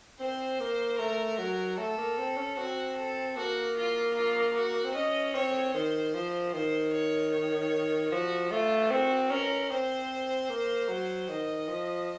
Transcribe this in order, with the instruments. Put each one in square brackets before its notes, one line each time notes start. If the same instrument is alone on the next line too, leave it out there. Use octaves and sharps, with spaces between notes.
[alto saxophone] C4 [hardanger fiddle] C5
[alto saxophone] A#3
[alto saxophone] A3 [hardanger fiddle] A#4
[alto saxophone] F#3
[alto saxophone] A3 [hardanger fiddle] A4
[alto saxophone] A#3
C4
C#4
[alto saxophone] C4 [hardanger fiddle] F#4
[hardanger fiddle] A4
[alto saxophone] A#3 [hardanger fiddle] F#4
[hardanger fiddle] F4
F4
F#4
[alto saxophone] C4
[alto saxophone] C#4 [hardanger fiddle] D#5
[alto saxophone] C4 [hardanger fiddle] C#5
[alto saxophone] D#3 [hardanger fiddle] C5
[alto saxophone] F3
[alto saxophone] D#3 [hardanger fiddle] C5
[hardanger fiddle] C#5
C#5
[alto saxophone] F3 [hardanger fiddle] F#4
[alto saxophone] A3 [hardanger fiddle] F4
[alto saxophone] C4 [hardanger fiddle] F#4
[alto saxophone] C#4 [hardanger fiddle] A#4
[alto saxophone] C4 [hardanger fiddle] C5
[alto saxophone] A#3
F#3
[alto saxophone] D#3 [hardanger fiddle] D#5
[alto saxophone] F3